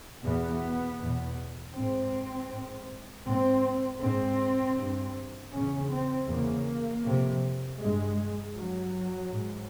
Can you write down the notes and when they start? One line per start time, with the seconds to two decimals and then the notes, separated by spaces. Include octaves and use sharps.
0.23 E2 B2 B3
0.99 E2 B2
1.75 G#2 C4
2.50 G#2
3.25 G#2 C4
4.01 G#2 C4
4.77 G2
5.52 E2 C#3 C#4
5.90 C4
6.28 E2 C#3 A#3
7.05 F2 C3
7.79 G2 G#3
8.55 G2 F#3
9.31 G#2